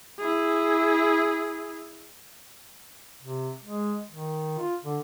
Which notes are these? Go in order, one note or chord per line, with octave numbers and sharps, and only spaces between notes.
E4 G#4
C3
G#3
D#3
F4
D3